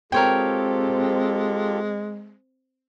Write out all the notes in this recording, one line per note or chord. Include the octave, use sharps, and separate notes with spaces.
G#3 C4 F4 G4 A4 A#4 C#5 G5